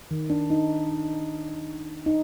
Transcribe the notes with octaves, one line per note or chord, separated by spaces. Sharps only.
D#3
D4
D#4
D#4